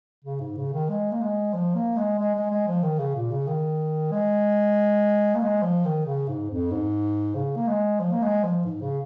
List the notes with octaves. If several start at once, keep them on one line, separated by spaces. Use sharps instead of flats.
C#3
G#2
C#3
D#3
G#3
A#3
G#3
F3
A#3
G#3
G#3
G#3
G#3
F3
D#3
C#3
A#2
C#3
D#3
G#3
A#3
G#3
F3
D#3
C#3
G#2
F2
G#2
C#3
A#3
G#3
F3
A#3
G#3
F3
G#2
C#3